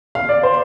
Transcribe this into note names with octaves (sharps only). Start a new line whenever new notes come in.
F5
D5
C5